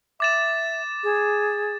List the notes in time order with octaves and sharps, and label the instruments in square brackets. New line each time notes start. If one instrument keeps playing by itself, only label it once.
[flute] E5 [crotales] D6 A6 E7
[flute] G#4